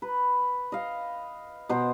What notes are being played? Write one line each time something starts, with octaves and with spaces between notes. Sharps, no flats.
B4
D#5 F5
B2 C5